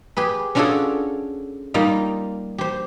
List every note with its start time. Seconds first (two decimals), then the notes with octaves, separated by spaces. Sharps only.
0.17 G4 G#4 B4
0.55 C#4 D4 F4 F#4 G#4 A4
1.74 G3 A#3 D#4 F4
2.58 G4 C5